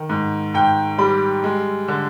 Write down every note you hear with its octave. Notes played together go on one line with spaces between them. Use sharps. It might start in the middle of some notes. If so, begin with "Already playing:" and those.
Already playing: D#3
G#2
G#2 G5
G3 B5
G#3
D3